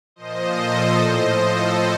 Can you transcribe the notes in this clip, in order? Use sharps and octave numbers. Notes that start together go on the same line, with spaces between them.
A#2 F3 C5 D#5
A4 C5
A2 F3 C5 D#5
A4 C5